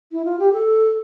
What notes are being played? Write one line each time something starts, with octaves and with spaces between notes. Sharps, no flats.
E4
F4
G4
A4